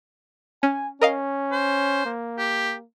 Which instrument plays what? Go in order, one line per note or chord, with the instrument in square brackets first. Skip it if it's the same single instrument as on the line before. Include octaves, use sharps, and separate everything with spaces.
[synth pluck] C#4 [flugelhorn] G#5
[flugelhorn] C#4 [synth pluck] A#4 D#5 F5
[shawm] C5
[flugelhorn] A#3
[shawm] G4